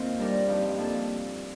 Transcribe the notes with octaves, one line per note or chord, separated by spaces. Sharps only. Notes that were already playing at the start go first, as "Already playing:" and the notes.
Already playing: D#2 A#3 C4 D#4 F4 C5
G3 D4 G4 A#4 D5
G2 F3 A#3 D#4 G4
F3 A#3 D4 A4